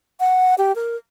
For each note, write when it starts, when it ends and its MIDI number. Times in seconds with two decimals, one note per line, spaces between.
0.20 0.55 78
0.58 0.75 67
0.75 0.96 70